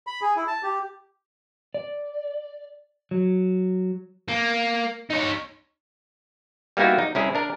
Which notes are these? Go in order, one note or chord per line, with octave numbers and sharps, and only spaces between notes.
B5
G#4
E4
A5
G4
D5
F#3
A#3
D#4 C#5
G3 A#3 B3 D#4 E4 F#4
D#4
C2 C#4 E4 G#4
D4 A#4